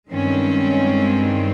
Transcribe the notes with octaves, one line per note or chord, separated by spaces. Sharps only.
G2 D#3 G#3 C4 C#4